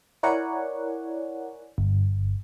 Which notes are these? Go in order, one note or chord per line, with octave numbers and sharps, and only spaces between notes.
E4 A#4 C#5 D5 F#5 G#5
G1